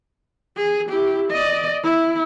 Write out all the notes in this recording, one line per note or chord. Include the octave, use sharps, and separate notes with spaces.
G#4
E4 G4
D5 D#5
E4